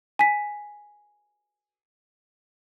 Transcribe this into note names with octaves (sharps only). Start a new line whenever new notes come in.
G#5 B6